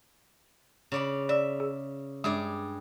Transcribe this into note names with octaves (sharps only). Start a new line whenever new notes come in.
C#3 D5 B5
D5 E5
G#4
G2 G#3 G#4 D5